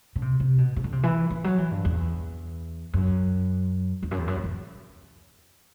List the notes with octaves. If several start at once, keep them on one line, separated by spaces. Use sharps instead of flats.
D3
C3
C3
B2
C3
D3
C3
E3
E3
F#3
E3
G2
E2
F#2
E2
F#2
E2
F#2
E2
F#2